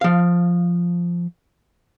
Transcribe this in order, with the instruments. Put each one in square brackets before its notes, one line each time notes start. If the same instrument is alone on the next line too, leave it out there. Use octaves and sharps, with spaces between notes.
[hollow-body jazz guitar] F3 F5